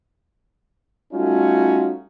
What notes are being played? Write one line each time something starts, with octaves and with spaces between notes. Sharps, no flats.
G3 A3 C#4 D#4 F4 F#4